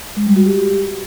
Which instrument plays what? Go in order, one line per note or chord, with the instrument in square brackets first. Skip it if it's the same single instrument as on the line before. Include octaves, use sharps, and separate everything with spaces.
[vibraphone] G#3
G3
F#4
G4